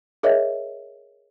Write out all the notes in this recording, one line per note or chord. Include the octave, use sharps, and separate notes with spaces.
G#4 A#4 C#5 D#5 E5